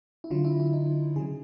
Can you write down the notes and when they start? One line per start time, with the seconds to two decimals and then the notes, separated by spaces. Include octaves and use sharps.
0.24 E4
0.31 D3 F#3 F4
0.44 E4
0.60 E4
0.73 D#4
1.16 C#3 F#3 G#4